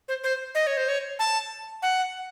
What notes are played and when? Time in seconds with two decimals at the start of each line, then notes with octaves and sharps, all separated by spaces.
0.08 C5
0.24 C5
0.55 D#5
0.67 C#5
0.77 C5
0.88 C#5
1.19 A5
1.82 F#5